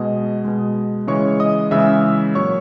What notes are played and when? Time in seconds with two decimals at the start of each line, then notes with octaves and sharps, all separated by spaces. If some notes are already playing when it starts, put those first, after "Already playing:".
Already playing: B2 G#3 D#5
0.44 B2 G#3
1.07 C#3 E3 G#3 C#5 C#6
1.40 D#5 D#6
1.71 C#3 E3 G#3 E5 E6
2.35 A#2 F#3 C#5 C#6